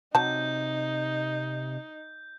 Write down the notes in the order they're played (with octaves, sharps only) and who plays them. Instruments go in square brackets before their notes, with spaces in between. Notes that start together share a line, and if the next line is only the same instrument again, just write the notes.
[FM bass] C3 [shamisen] F#3 A5 [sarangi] D#4 [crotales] G6